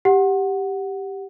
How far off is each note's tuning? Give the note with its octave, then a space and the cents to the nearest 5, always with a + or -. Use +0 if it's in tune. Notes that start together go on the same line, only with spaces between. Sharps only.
G4 +0 F#5 +0